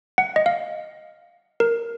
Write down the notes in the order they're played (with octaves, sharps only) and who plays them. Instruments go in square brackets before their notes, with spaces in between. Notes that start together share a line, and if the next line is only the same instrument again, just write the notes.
[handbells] F#5
D#5
F5
A#4